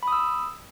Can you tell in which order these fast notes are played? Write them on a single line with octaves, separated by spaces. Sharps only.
B5 D#6 E6